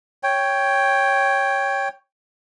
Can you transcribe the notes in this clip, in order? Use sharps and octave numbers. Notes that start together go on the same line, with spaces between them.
C#5 G5